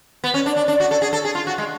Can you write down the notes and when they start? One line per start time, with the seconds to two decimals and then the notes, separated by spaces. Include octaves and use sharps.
0.24 B3
0.34 C#4
0.46 D4
0.56 D4
0.68 D4
0.80 F#4
0.91 A4
1.02 G#4
1.13 A4
1.25 G#4
1.35 F4
1.47 F#4
1.58 G#3